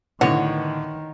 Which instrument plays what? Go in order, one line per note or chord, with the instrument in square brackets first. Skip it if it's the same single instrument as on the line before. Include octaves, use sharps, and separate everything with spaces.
[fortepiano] A2 D3 [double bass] D#3 [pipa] B3 F#4 C#5